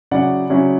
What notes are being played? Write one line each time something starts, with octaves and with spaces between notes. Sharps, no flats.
C#3 F#3 C#4 E4 D5 F#5
C#3 F#3 C#4 E4